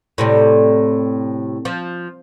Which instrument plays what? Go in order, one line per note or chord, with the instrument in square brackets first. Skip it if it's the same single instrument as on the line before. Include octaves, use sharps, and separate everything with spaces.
[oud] A2 C3 G3
F3